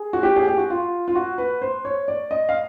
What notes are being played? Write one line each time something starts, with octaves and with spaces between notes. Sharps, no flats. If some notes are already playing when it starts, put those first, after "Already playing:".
Already playing: G#4
F#4
G4
G#4
G4
F#4
F4
F4
F#4
B4
C5
C#5
D5
D#5
F5